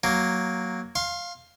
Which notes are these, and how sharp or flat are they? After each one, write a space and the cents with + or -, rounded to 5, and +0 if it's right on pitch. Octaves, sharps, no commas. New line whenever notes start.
F#3 +0 A#3 +0
F5 +0 C6 +30